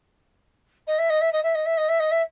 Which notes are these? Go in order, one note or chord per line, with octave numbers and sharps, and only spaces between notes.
D#5
E5
D#5
E5
D#5
E5
D#5
E5
D#5
E5
D#5
E5